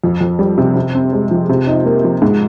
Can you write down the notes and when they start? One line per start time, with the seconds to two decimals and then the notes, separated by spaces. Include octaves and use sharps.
0.04 F2
0.21 F2
0.39 G3
0.58 C3
0.76 C3
0.95 C4
1.13 G#3
1.31 F3
1.49 C3
1.67 D#4
1.86 A#3
2.04 F3
2.22 G#2